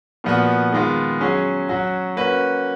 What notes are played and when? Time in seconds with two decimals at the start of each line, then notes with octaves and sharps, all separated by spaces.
0.24 A#2 F3 B3 F#4
0.72 D#3 G#3 B3 F4
1.21 F#3 C#4 G#4
1.69 F#3 C#4 F#4
2.17 A#3 C#4 F#4 B4